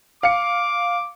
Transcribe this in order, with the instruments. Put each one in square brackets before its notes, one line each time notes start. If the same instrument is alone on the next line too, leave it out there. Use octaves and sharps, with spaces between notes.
[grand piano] F5 C#7 [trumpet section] D6